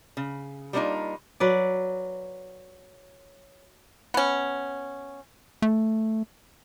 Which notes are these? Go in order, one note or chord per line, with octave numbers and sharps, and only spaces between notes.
C#3
G3 A#3 B3 D4 D#4 F4
F#3 B4 D5
B3 C#4
A3